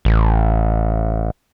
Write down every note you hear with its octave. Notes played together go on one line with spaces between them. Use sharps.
A1